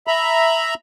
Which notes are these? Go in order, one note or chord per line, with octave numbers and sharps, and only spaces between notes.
E5 A#5 B5